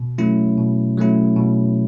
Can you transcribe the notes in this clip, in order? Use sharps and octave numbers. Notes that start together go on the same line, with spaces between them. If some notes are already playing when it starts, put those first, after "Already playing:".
Already playing: B2
F#3 A3 C#4 E4
B2
F#3 A3 C#4 E4
B2